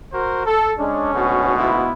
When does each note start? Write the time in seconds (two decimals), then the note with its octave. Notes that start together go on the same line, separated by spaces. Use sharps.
0.13 F#4 A#4 C5
0.45 A4
0.78 G#3 C#4 D4
1.13 D2 G#2 B2
1.56 B3 E4 F4